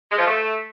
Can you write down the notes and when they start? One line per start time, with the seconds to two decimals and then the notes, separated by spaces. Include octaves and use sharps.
0.10 G#3
0.18 F3
0.26 A3